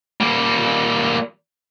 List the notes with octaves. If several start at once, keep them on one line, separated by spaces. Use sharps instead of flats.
G3 A#3